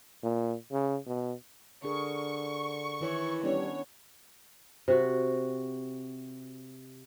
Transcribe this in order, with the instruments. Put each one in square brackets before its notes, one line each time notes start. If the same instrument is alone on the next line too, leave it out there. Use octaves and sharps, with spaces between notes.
[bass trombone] A#2
C#3
B2
[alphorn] D3 [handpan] D4 G#4 A#4 [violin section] C#6
[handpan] D#3 E4 C#5 [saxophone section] E3
[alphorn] G3 [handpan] B3 C#4 D4 [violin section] C#5
[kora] C3 F#4